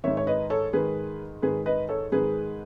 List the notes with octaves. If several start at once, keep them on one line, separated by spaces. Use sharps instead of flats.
G#2 D#3 C#5 E5
C#5
B4 D#5
A4 C#5
G#2 D#3 G#4 B4
G#2 D#3 G#4 B4
B4 D#5
A4 C#5
G#2 D#3 G#4 B4